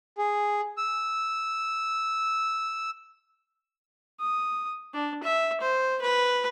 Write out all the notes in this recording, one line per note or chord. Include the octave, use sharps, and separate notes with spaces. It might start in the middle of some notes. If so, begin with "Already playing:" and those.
G#4
E6
D#6
D4
E5
C5
B4